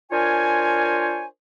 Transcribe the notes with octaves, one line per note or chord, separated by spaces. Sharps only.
D4 F4 A#4 C5 C#5 G#5